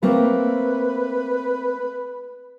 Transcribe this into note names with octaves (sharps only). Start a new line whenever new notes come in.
A3 A#3 C4 B4